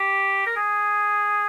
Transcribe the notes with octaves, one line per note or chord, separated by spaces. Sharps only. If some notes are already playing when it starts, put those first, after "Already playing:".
Already playing: G4
A#4
G#4